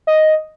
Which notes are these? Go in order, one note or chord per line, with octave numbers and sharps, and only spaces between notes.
D#5